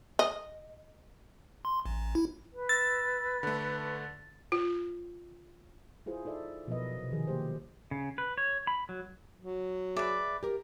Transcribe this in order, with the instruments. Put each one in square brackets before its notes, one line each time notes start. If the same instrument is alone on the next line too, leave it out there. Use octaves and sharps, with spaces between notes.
[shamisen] D#5
[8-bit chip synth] C6
A1
E4
[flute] B4
[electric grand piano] E6 A#6 [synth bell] A6
[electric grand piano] D3 A3
[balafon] F4
[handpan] E4 F4 G#4 C5
D#4 A4 D5 E5
B2 F3 F#3 A#4 B4 D#5
C3
D#3 F3 G4 G#4
F#3 A#3 G4 C5
[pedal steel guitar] C#3
B4
C#5
B5
F#3
[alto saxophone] F#3
[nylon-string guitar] G#4 E5 [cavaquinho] B4 D5
[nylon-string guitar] G4 A#4